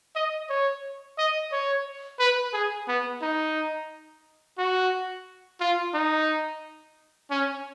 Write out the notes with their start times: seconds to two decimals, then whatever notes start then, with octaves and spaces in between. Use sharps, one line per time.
0.16 D#5
0.50 C#5
1.18 D#5
1.52 C#5
2.19 B4
2.53 G#4
2.88 B3
3.22 D#4
4.58 F#4
5.61 F4
5.94 D#4
7.31 C#4